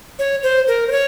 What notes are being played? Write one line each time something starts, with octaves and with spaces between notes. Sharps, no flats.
C#5
C5
A#4
C5
C#5